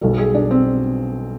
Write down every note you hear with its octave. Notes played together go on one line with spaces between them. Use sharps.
B1 B2 G3 A4
G#4
D4
C4